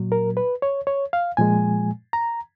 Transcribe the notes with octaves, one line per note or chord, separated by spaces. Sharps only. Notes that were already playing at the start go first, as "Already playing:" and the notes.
Already playing: A#2 F#3
A#4
B4
C#5
C#5
F5
A#2 F3 G#3 G#5
A#5